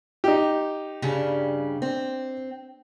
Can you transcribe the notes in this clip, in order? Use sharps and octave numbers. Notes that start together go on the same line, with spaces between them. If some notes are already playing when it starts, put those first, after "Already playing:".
D#4 G4
G2 C#3 G3
C4